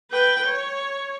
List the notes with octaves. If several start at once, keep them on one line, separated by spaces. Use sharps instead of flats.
B4 G5
C#5